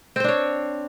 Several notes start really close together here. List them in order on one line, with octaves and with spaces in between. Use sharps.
C4 C5 D4 C#5